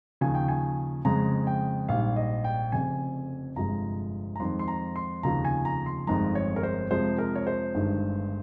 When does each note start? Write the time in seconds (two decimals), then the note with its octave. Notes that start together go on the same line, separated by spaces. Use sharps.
0.21 D#2 C#3 F3 G#5
0.35 G5
0.48 G#5
1.05 F2 C#3 G#3 A#5
1.47 G5
1.89 A#1 G#2 G3 F5
2.16 D#5
2.44 G5
2.72 F1 F2 C#3 G#5
3.56 G1 F2 C3 F3 G#3 A#5
4.36 A#5
4.40 F2 D#3 G#3 C6
4.59 C6
4.68 A#5
4.96 C6
5.23 F1 D#2 C#3 F3 A#5
5.45 G#5
5.65 A#5
5.86 C6
6.07 G1 F2 D#3 G#3 A#5
6.35 C#5
6.56 A#4
6.63 C5
6.91 F2 C3 F3 G#3 C5
7.18 A#4
7.35 C#5
7.47 C5
7.75 G1 G2 D#3 G#3